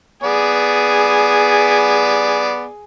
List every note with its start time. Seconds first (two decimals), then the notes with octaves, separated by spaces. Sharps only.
0.23 B3 G#4 D5